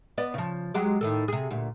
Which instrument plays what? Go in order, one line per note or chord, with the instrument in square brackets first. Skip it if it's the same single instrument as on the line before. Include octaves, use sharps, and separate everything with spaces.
[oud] B3 D5 D#5
C#3 F3
F#3 G#3 G4
A2 D#3 A4
C3 G#4
D2 A#2